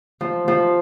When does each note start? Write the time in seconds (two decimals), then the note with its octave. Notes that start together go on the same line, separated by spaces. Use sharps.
0.21 F3
0.48 F3